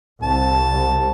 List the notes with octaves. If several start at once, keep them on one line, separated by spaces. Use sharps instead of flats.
C2 A5